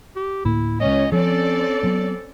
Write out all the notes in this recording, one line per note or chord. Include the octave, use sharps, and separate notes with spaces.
G4
D2 A2 A#3 E4
C#2 C#4 D#5
F3 C4 C#4 A4 D5
F#3 B3